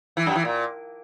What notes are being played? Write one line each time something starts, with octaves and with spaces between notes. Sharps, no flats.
E3
F#2
E3
A#2